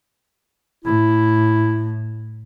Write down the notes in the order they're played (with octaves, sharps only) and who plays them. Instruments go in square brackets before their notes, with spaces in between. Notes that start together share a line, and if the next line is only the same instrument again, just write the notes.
[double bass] A2 [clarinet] E4